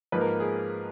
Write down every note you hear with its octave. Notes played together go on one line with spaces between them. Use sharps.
G#2 F3 A#3 B4
A#4
G#4